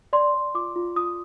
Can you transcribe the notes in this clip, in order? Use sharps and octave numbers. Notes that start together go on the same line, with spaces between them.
D5 C6
D5
F4 D6
F4
F4 D#6